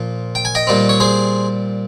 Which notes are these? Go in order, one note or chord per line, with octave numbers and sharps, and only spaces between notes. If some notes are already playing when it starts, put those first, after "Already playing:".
Already playing: A#2 F3
G5
G#5
D#5 G5
A#2 G3 C4
C#5
G#4 C5